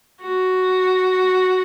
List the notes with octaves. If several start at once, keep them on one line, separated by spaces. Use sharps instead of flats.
F#4